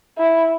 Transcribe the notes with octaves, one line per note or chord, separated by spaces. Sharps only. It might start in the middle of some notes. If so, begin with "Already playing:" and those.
E4